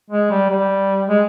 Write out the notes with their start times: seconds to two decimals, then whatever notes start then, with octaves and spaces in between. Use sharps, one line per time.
0.10 G#3
0.31 G3
0.50 G3
1.08 G#3